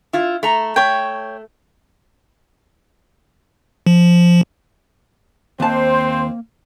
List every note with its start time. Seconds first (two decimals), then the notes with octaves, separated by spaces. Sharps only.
0.13 E4 F4
0.43 A3 A#5
0.76 A3 C#5 G5
3.87 F3
5.60 D#2 A#3 C4 C5 A5